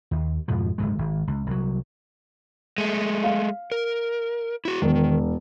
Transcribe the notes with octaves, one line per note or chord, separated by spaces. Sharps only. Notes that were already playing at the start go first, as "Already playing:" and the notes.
D#2
F2 G#2 B2 F3
F#1 D2 G#2 G#3
G#1
C#2
C2 F#3
G#3 A3
F5
A#4
E4 F#4
E1 D#3